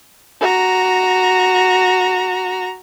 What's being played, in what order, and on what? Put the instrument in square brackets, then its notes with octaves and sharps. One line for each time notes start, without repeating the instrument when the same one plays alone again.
[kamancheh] F#4 A#5